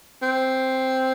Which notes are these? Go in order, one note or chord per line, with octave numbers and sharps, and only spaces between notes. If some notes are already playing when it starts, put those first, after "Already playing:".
C4